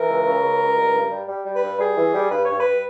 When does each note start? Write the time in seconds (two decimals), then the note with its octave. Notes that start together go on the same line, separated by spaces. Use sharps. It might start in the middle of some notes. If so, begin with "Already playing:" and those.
Already playing: E3 A#4
0.08 C#2
0.26 C#3
0.43 C#2
0.60 C#2
0.77 G2
0.94 G2
1.11 G3
1.28 G3
1.46 G3
1.54 B4
1.63 G2
1.79 G3 G#4
1.96 E3
2.13 G3
2.30 G2 B4
2.44 G2 C#5
2.58 B4
2.64 G2